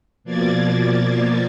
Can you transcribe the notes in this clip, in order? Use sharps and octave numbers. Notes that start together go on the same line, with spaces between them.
B2 F3 A#3 D5 G#6 A6